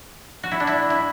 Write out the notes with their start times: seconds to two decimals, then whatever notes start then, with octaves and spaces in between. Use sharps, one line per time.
0.43 F#4
0.51 E4
0.60 D4
0.67 E4
0.90 E4